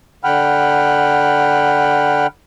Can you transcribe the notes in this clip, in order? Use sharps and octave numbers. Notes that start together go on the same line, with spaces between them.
D3 F#5 G5 B5 F6